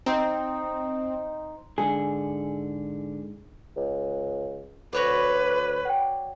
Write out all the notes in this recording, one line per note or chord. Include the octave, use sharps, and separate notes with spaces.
C4 D#4 C5 G5
G#2 D3 G#4
C#2
D2 F#4 B4 C#5 D5
F#5 G5